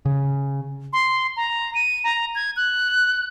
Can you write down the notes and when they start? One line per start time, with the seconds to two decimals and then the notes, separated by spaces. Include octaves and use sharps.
0.05 C#3
0.93 C6
1.37 A#5
1.75 D#7
2.04 A#5
2.35 G#6
2.56 F#6